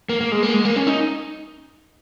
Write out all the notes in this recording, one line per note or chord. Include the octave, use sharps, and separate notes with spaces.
A#3
A#3
G#3
A#3
G#3
A#3
C#4
D#4